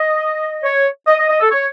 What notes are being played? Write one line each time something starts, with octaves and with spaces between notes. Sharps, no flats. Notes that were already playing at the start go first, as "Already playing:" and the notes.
Already playing: D#5
C#5
D#5
D#5
D#5
A4
C#5